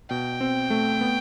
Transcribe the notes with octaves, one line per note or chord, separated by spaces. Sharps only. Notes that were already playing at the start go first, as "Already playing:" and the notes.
B2 G5
C4
A3
B3